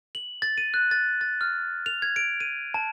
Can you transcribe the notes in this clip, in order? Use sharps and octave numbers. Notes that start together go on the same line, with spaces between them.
F#7
A6
D#7
F#6
A6
A6
F6
F7
G#6
D7
D#7
A5